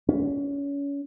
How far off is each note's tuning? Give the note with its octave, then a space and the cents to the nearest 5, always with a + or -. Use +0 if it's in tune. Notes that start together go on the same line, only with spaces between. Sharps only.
C#4 +30